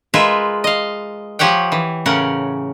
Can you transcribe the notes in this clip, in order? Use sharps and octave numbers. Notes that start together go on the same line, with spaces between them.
G#3 F4 G#4 A#4 B4 E5
D#5 F5
F3 G4 C#5 F#5 G5
E3
A2 C#3 C#4 A#4 F#5